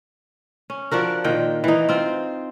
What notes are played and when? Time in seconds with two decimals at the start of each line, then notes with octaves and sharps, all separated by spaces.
0.70 C#4
0.91 F3 D4 F#4 A#4
1.24 A#2 D#3 G5
1.64 E3 D#4
1.89 C4 F4